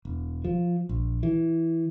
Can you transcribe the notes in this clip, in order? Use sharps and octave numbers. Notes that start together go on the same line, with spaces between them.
E1
F3
A#1
E3